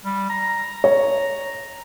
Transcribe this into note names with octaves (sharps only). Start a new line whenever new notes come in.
G3
A#5
C#5